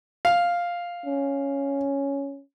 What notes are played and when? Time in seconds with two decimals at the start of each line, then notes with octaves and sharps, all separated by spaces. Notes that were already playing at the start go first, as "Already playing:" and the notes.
0.25 F5
1.06 C#4